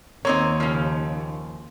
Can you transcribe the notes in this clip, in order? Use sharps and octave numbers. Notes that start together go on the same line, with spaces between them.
D#2 A#3 C4 D#4 C#5
C#3 F3